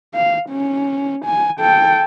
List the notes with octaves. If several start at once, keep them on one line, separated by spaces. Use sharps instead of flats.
F5
C#4
G#5
A4 G5